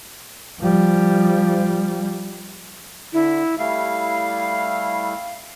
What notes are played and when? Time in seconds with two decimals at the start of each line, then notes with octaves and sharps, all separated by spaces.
0.60 F3 G3
3.13 D3 E4
3.58 G3 A3 E4 F5